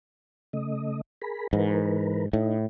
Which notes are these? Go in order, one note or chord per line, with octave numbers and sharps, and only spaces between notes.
C#3 A3 D#5
G#4 A#4 B5
G#2 E3 A#4 B4
A2 D#4